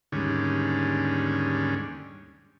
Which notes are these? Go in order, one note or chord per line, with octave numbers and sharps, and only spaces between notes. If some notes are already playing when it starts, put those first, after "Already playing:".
D#2 G#2 D3 G3 C#4